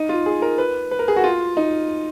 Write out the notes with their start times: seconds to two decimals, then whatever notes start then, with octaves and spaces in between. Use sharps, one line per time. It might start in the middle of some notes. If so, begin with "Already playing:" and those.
Already playing: D#4
0.09 F4
0.26 G#4
0.42 A#4
0.58 B4
0.91 B4
0.99 A#4
1.08 G#4
1.16 F#4
1.24 F4
1.57 D#4